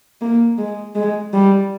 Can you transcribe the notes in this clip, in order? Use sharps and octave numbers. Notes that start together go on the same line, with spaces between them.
A#3
G#3
G#3
G3